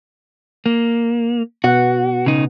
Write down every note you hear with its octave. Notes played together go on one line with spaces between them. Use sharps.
A#3
B2 B3 F#4 F#5
C#3 D#4